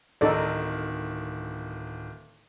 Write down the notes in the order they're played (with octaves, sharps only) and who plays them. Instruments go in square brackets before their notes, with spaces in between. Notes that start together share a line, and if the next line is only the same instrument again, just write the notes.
[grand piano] D1 D#3 [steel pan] D#4 A4 D5